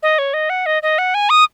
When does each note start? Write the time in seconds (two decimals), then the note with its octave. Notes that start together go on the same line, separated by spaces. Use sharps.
0.03 D#5
0.19 C#5
0.34 D#5
0.50 F#5
0.66 D#5
0.83 D#5
0.98 F#5
1.14 G#5
1.30 D#6